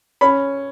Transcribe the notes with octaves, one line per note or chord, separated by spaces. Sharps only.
C#4 B5